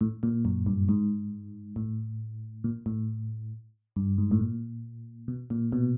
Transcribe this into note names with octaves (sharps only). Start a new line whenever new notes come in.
A2
A#2
F#2
G2
G#2
A2
A#2
A2
G2
G#2
A2
A#2
B2
A#2
B2